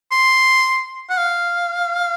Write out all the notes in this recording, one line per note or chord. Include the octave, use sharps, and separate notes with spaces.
C6
F#5
F5